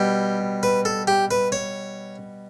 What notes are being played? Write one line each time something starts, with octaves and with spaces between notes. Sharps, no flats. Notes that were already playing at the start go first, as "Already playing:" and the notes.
Already playing: B2 G3 G4
B4
A4
G4
B4
C#5